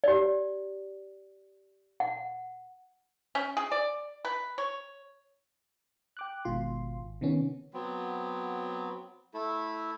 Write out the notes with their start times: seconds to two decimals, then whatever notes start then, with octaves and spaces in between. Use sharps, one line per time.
0.04 G4 D5
2.00 F#5
3.35 C#4
3.57 G#4
3.72 D5
4.25 B4
4.58 C#5
6.17 G5 D6 F#6
6.45 G#1 G#2 B2 F4 C6
6.99 G#1
7.21 C3 D#3 B3 C#4
7.74 F#3 B3 C4
9.34 A3 E4 A4